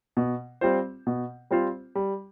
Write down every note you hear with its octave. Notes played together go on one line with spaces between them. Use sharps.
B2
G3 C4 F4 C5
B2
G3 C4 F4 C5
G3